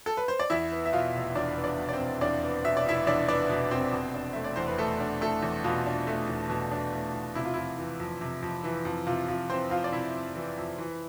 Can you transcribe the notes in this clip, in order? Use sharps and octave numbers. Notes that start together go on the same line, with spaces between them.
A4
B4
C5
D5
E2 E4 E5
B3
E5
B2 F4 F5
F1
E2 D4 D5
B3
D4 D5
B2
D5
C4 C5
F1
E2 D4 D5
B3
B2 E5
D5
F1 E4 E5
E2 D4 D5
B3 D4 D5
B2
F1 C4 C5
B2
D4
A3 E5
D5
E2 C5
B4
B2 A3 A4
D4
A3 A4
E2
B2 F4
D4
A3
E2
B2
D4
A3
E2
C3 E4
F4
F2 E4
E3
F2
C3
F2
E3
F2
C3 F4
F2 F4
E3 C4 C5
F2 F4 F5
D5
C3 E4 E5
F2
E3
F2
E3